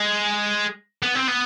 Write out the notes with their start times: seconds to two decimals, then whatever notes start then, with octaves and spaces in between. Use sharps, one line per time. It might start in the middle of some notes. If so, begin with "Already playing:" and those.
Already playing: G#3
1.03 B3
1.15 C4
1.27 B3